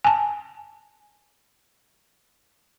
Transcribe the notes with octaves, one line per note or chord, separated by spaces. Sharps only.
G#5 A5